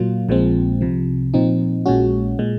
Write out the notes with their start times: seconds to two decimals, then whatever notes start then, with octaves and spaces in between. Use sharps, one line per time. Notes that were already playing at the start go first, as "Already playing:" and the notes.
Already playing: A#2 F#3 A#3 F4
0.29 A#1 A#2 F3 G#3 C4
0.81 C2 C3 F3
1.34 A#2 F3 C4 D#4
1.86 A#1 A#2 G#3 C#4 F#4
2.39 A#2 G#3